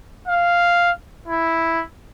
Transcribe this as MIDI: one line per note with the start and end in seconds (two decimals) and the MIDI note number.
0.28 0.90 77
1.28 1.84 64